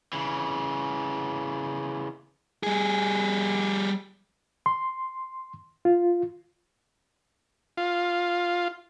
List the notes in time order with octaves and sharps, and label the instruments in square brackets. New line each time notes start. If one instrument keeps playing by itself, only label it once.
[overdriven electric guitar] C#3 E3
[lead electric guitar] G3 G#4
[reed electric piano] C6
F4
[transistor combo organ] F4